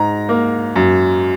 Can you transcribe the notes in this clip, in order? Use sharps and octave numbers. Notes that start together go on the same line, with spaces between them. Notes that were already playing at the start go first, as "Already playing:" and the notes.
Already playing: G#2 A#5
A#3
F#2